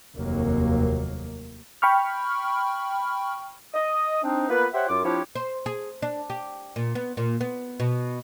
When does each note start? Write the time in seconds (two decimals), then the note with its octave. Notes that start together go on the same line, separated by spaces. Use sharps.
0.16 F1 D#2 F#3 A#3
1.82 G5 B5 C#6 F6
3.74 D#5 D#6
4.24 C4 D4 D#4
4.49 A#3 B3 F4 B4
4.74 G4 C5 C#5 E5 F#5
4.89 F#2 F4 D6
5.04 F3 C4 D4 E4 G4 C#5
5.35 C5
5.66 G#4
6.02 D4
6.30 G4
6.76 A#2
6.95 B3
7.17 A#2
7.41 B3
7.80 B2